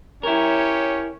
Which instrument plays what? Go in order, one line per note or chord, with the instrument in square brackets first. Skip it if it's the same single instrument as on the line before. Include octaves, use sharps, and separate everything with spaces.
[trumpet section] C#4 G4 C#5 [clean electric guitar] E4 A#4